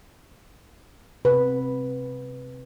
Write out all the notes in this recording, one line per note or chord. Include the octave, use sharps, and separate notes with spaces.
C3 B4